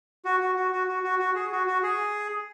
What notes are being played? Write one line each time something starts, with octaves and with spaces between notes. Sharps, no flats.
F#4
F#4
F#4
F#4
F#4
F#4
F#4
G#4
F#4
F#4
G#4